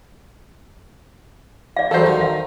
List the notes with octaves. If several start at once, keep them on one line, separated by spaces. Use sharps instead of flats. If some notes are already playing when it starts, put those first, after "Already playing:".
D5 F5
E2 F#3 G3 A4 C5 F5
D#3
F5